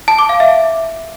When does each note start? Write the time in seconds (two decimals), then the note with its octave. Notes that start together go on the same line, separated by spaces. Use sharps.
0.08 A5
0.19 D6
0.29 F5
0.40 E5